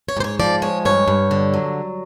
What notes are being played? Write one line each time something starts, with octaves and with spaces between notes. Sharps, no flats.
C#5
G#2 C5
C#5
F3 D5
G#3 C#5
G2 C#5
G2
D3
F#3